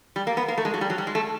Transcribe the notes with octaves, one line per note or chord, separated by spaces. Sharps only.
G3
A#3
B3
A#3
A3
G#3
F#3
G3
F#3
G3
G#3
A3